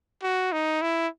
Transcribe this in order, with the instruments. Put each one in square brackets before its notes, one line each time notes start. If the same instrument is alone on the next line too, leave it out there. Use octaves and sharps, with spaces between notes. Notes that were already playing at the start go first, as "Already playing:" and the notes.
[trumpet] F#4
D#4
E4